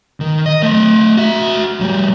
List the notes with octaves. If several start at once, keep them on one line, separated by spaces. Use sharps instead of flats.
D#3
D#5
A3 D#5
F#4 E5
F3 G3